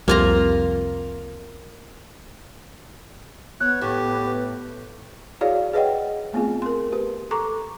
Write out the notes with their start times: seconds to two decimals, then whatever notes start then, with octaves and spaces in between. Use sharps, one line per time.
0.08 C2 F2 C3 A#3 F4 A#5
3.60 B3 C#5 F#6
3.81 A2 G4
4.25 B4
5.41 E4 F#4 G#4 C#5 D5 F5
5.73 G#4 B4 C#5 D#5 F#5 G5
6.33 A3 B3 C4 F4 G#4
6.62 A#4 C6
6.92 G4 B4
7.31 A4 A#5 C#6 D6